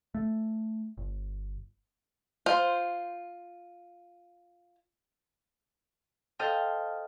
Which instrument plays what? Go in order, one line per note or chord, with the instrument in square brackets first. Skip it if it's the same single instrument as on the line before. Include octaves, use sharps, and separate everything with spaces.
[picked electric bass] A3
G1
[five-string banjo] F4 C5
[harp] A4 C5 D#5 F5 G5